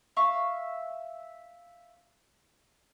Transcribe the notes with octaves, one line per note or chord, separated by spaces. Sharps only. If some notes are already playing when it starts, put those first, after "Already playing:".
E5 F5 C#6